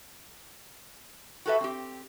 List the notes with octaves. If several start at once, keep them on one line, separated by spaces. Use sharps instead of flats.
F#4 G4 A4 B4 E5
C4 G4